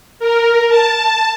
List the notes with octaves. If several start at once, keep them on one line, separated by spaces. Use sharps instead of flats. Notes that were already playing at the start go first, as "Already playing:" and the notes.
A#4
A5